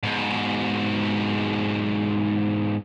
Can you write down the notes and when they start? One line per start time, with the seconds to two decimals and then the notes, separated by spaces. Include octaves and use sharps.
0.03 G#2 B2